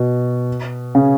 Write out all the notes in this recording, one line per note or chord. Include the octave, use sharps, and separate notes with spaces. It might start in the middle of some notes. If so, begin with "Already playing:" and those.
Already playing: B2
C#3